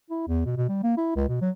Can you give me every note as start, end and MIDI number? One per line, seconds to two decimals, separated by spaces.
0.10 0.26 64
0.28 0.42 40
0.45 0.53 47
0.57 0.65 47
0.69 0.79 55
0.83 0.94 58
0.97 1.13 64
1.16 1.24 37
1.29 1.41 47
1.42 1.50 54